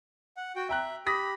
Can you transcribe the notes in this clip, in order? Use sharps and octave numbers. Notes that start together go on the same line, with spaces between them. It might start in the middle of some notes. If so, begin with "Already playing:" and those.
F#5
F#4 G5
E5 G5 A#5 F#6
G4 B5 D#6 A#6 B6